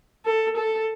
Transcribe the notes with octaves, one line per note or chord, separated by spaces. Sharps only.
A4
A4